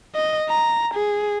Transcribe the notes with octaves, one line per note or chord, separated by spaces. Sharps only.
D#5
A#5
G#4